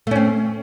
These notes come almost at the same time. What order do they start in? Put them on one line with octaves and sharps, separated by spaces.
A3 C#4 C4